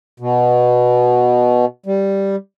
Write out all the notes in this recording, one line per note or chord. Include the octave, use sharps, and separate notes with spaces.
B2
G3